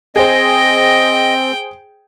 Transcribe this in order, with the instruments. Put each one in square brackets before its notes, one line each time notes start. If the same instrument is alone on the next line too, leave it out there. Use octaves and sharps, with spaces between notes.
[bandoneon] C4 [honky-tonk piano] G#4 C5 [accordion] D#5 [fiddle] G5